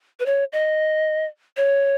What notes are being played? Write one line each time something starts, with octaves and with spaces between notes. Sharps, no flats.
B4
C#5
D#5
C#5